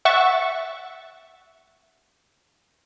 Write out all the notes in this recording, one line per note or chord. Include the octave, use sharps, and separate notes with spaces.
E5 F#5 C#6 A6